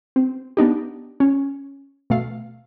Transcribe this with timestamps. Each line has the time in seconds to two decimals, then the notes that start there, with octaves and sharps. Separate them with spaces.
0.16 C4
0.57 B3 D4 D#4 G4
1.20 C#4
2.10 B2 A3 F5